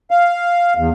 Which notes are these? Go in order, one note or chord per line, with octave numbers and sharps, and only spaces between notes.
F5
E2